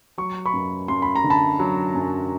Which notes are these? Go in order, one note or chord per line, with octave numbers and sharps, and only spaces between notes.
F#3 C#6
B5 C#6
F#2
F#2 C6
B5
A#5
D3
A5 B5
F#3
F#2